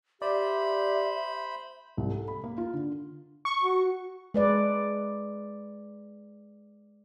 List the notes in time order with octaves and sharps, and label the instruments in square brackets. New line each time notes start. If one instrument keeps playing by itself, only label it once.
[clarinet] G4 [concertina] C5 B5 [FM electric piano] D5 [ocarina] E5
[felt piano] C2
A4
B5
A#3
F4
D3
[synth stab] C#6
[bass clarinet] F#4
[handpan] G#3 B4 D5